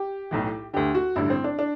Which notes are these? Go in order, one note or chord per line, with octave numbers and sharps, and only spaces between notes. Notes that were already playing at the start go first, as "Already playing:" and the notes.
Already playing: G4
B1 A2 E3
D2 D3 G4
F#4
A1 G2 D3 E4
C4
D4
D4